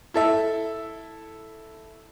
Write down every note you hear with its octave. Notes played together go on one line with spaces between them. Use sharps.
E4 A4 E5